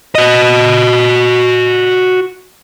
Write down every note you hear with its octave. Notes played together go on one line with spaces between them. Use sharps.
F#4 D#5